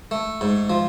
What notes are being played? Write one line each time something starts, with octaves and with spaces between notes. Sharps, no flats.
A3
G#2
F3